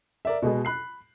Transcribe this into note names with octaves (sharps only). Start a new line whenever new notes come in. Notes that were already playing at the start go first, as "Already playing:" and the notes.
A#4 D5 E5
B2 G#3 B3 G#4
B5 F#6 C7